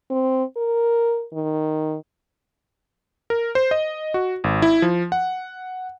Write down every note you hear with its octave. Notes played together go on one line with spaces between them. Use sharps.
C4
A#4
D#3
A#4
C5
D#5
F#4
G#1
E4
F3
F#5